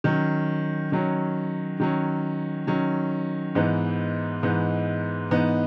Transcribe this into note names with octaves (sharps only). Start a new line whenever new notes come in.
D#3 F#3 C#4
D#3 F#3 C#4
D#3 F#3 C#4
D#3 F#3 C#4
G#2 E3 B3 D#4
G#2 E3 B3 D#4
G#2 E3 B3 D#4